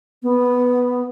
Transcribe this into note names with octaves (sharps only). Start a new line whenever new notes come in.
B3